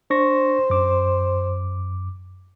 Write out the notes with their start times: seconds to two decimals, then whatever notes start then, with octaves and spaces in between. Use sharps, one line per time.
0.10 D4 C5 C#6 A#6
0.70 F#2 D6